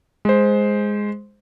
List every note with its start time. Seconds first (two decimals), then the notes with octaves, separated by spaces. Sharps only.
0.25 G#3 C5